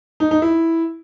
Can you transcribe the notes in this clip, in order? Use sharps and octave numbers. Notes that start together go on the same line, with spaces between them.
D#4
D#4
E4